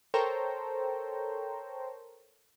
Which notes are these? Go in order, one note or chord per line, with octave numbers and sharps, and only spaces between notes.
A4 A#4 C5 C#5 G5 A#5